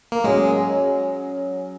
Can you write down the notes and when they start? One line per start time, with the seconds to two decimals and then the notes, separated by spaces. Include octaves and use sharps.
0.12 A#3
0.24 F#3 G#3 C#4 G#4